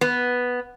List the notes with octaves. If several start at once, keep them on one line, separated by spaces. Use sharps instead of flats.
B3